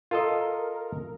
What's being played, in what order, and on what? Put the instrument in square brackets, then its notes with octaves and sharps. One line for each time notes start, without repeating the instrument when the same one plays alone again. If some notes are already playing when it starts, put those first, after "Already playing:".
[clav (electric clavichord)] F4 A4 D#5 [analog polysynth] A#4